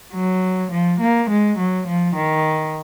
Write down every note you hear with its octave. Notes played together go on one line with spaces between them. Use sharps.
F#3
F3
A#3
G#3
F#3
F3
D#3